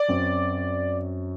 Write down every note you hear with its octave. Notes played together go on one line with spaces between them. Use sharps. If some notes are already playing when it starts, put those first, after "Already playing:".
Already playing: D5
F#2 F#3 C4